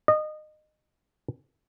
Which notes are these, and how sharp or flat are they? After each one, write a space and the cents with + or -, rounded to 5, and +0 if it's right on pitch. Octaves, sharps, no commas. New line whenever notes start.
D#5 -25